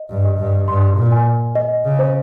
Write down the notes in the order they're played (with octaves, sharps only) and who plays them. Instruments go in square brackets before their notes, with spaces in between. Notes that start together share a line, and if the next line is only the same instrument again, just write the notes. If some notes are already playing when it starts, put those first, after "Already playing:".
Already playing: [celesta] D#5
[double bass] G2
[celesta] D#5
[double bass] G2
[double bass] G2 [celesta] C6
[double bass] A#2
[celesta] G#5
D#5
[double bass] C#3
[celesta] C5